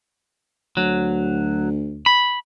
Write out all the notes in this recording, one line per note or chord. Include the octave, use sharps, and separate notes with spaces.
D2 F#3
B5